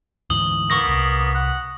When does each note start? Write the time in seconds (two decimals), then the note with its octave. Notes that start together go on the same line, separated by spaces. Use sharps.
0.30 D2 G#2 E3 D#6 F#7 G7
0.70 A#3 B3 C#6 D#6 A#6
0.88 C2
1.35 F#5